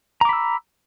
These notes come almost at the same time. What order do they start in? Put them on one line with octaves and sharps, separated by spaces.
A#5 D6 B5 E6